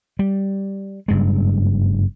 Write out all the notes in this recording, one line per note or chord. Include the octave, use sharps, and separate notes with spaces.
G3
F#1 G2 G#3